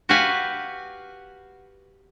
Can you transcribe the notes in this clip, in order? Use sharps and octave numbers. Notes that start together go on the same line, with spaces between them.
F#4 G4 B4 F5 F#5 G#5